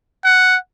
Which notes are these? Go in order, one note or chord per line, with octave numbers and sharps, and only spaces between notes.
F#5